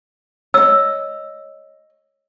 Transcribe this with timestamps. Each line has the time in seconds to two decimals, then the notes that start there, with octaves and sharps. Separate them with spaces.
0.54 C#5 D#5 E6